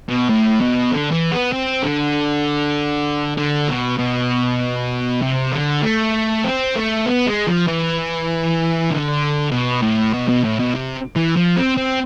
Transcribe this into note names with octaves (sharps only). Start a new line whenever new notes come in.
B2
A2
B2
D3
E3
B3
C4
D3
D3
B2
B2
C3
D3
A3
C4
A3
B3
G#3
F3
E3
D3
B2
A2
B2
B2
A2
B2
C3
E3
F3
C4
C4